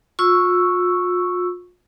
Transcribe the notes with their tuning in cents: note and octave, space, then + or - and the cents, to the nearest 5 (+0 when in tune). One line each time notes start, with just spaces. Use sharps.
F4 +40 C#6 +0 E6 +5